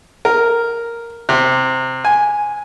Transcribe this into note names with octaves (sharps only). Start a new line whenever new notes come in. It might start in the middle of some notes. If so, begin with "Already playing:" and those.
A#4
C3
G#5